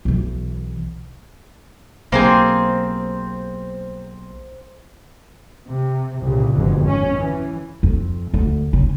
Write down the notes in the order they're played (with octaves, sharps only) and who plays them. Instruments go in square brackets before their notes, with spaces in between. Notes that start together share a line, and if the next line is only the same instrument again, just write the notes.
[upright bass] B1 E3
[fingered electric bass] B1 [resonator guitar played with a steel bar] A#3 C4 G#4 [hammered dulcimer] C5
[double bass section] C3
C2 A#2 C#3
G1 F2 G#2 B2 D3
G#1 C#4
E3
[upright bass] F2
D2
C#3